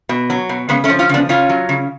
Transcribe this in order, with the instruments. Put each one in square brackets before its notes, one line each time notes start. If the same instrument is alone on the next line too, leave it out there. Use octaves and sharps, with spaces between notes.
[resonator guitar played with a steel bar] B2
F#3
B2
C#3 G#3 B3
A3 C#4
F3
C#4 F4
C#3 B3 D4
C#3 C#4 F4
F#3
C#3